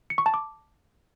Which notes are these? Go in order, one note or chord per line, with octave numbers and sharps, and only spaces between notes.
C#7
C#6
A5
D6